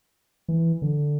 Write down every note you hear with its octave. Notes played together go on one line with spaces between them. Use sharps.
E3
D3